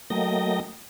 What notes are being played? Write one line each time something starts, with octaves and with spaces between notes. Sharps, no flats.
F#3 A3 A#3 D#5 G5 A#6